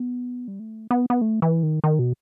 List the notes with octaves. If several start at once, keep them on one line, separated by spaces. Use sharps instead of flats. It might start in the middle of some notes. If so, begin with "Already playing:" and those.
Already playing: B3
G3
A3
B3
B3
A3
E3
D#3
D#3
B2